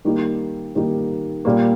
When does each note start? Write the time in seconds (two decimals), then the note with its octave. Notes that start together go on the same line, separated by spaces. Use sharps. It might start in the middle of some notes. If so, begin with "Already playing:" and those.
0.05 D#3 G3 A#3 D#4 G4
0.75 D#3 G3 A#3 D#4 G4
1.45 A#2 G3 A#3